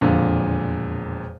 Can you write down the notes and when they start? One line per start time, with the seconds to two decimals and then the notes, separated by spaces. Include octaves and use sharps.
0.01 E1 F2 A#2 D3